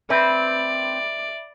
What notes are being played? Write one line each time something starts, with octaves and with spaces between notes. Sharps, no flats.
C4 B4 D5 E5